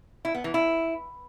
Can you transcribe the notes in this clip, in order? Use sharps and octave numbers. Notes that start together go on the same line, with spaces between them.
E4
B3
E3
E4